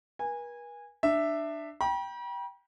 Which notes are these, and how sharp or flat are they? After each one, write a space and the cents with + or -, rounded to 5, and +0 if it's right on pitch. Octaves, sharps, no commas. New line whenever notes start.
B4 -45 G#5 -20
D4 +20 E5 +0
G5 +0 B5 -45